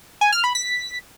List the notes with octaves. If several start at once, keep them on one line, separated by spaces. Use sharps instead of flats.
G#5
F6
B5
B6